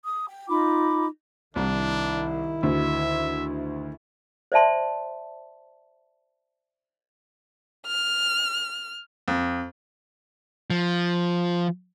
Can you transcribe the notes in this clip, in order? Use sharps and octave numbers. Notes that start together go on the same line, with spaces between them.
D#6
G5
D#4 F4 B5 D6
C2 D#3 D4 E4
D2 E5
C5 D5 E5 A5 C6
F6
F2
F3